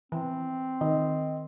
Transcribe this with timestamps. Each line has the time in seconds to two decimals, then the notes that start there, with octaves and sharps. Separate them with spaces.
0.12 E3 C4
0.81 D#3 D#5